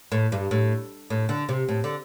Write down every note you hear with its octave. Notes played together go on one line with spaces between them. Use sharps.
A2
G2
A2
A2
D3
C3
A2
D3